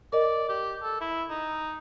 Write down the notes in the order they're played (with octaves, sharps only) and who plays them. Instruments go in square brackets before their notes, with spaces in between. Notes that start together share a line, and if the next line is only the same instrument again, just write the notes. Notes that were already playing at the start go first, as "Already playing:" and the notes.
[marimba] A#4 D#5 [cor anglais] D5
[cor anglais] G4
A4
E4
D#4